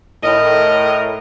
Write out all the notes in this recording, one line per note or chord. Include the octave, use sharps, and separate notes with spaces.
A2 A#4 D#5